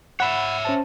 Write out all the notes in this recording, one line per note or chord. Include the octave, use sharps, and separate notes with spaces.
C#5 E5 F#5 B5
C#4 C5 A5